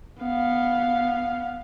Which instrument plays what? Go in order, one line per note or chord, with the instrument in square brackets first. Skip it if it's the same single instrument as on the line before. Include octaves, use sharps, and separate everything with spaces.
[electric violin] B3 F5